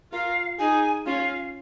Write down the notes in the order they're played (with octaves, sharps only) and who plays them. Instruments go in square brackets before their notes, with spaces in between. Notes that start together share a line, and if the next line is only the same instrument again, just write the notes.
[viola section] F4 A#4 [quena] F5
[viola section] D#4 G#4 [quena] G#5
[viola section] C#4 F4 [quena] F5